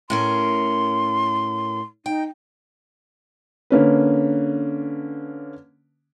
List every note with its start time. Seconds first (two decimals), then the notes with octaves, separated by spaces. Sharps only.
0.10 A2 C#4 A#4 C6
2.06 D#4 G5
3.70 D3 A#3 C#4 B4